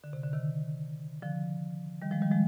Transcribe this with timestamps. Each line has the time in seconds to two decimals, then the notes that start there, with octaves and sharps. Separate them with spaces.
0.04 D3
0.13 C3
0.23 D3
0.33 C3 D#3
1.22 D3 F3
2.02 D#3 G3
2.11 F3 G#3
2.22 D#3 G3
2.31 F3 G#3